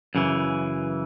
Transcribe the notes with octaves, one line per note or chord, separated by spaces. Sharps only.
F#2 C#3 E3